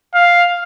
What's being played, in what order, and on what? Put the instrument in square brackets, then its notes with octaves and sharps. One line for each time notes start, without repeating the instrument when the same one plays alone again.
[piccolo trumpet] F5